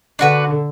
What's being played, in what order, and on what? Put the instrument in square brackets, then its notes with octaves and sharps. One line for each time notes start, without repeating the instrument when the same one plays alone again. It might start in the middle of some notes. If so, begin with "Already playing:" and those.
[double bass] D3 [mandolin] D4 F#4 B4